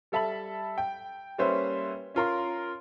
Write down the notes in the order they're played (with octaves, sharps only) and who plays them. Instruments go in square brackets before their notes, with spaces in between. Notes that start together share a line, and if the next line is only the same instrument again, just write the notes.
[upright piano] G3 A4 E5 A5 B5 F#7
G5
G3 A#3 C#4 B4 C5 E5
C#4 F4 A#4 C6